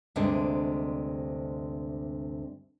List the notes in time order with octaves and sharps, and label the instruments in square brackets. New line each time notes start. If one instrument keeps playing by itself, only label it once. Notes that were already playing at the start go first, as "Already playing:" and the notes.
[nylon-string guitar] D2 G2 C3 G#3 C4 D4